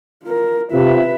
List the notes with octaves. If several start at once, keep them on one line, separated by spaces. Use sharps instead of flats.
F4 A#4
C3 F4 B4 E5